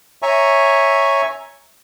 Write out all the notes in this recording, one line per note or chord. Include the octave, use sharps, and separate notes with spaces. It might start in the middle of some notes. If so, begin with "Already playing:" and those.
C#5 E5 G#5 A#5 C#6